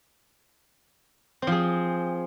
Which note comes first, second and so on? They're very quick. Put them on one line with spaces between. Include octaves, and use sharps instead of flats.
C4 F3 G#4